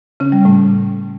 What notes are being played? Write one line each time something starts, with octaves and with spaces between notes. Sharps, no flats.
C#3 C#4
G3
A2 A3